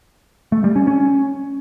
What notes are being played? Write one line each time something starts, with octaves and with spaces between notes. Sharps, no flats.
A3
G3
C#4
C#4